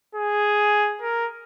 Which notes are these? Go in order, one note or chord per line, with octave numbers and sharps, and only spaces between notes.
G#4
A#4